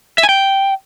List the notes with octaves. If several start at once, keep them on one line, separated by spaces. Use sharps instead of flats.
E5
G#5
G5